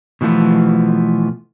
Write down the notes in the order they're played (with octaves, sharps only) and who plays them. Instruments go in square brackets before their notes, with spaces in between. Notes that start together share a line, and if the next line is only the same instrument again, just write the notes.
[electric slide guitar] B2 E3 F3 A3 B3